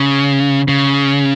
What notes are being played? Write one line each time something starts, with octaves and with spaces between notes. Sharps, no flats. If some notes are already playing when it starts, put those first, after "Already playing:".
Already playing: C#3
C#3